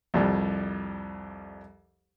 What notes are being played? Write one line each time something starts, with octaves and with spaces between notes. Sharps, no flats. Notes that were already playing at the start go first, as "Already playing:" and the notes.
C2 F2 G3